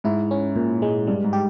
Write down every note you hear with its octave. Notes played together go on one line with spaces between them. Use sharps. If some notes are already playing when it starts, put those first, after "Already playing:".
G#2 E4
C#4
A#2
G#3
G2 G3
G#2
G4